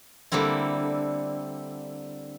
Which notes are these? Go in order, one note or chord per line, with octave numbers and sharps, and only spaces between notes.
D3 G3 A#3 C4 E4